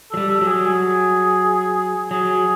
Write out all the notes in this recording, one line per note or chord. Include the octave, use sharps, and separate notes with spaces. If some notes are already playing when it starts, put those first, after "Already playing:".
F#3 A4
G3
A4
F#3
G#4
G#4
F#3 G#4